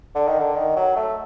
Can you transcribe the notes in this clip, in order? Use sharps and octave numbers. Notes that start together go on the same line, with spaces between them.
D3
D#3
D3
D#3
F#3
A3